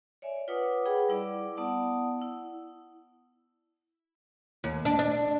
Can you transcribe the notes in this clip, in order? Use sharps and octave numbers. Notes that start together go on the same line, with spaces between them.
C#5 D5 E5 G#5
F4 B4 C#5 F#5 D6 D#6
G#4 B4 F#5 G5 B5
G3 E4 D5 D6
B3 E4 D5 F#5 A5 D#6
E4
D#2
D4
D4